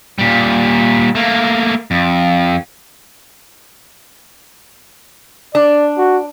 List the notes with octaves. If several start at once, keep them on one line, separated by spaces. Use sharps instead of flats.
A#2 G3
A3 A#3
F2
D4 D5
F#4